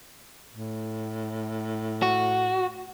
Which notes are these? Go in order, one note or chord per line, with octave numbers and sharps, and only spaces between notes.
A2
F#4